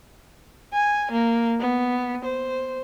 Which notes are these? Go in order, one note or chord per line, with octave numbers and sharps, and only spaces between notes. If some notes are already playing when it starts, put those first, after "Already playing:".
G#5
A#3
B3
C5